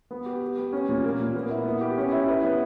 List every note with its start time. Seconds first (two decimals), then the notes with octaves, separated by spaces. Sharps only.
0.11 B3
0.26 G4
0.42 G4
0.58 B3
0.73 C#4
0.89 A#2
1.04 A#3
1.20 A#2
1.35 B3
1.50 E4
1.65 B3
1.81 G4
1.97 C#4
2.12 E4
2.28 B4
2.44 B3